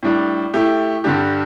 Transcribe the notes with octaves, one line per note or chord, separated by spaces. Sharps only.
A2 G3 D4
A2 A3 E4 G4
G2 D3 G3 D4 G4